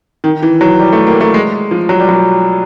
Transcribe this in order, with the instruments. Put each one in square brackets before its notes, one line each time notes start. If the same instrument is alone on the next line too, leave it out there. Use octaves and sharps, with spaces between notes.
[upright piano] D#3
E3
F#3
G3
A3
A#3
A3
G#3
F3
F#3
G3
F#3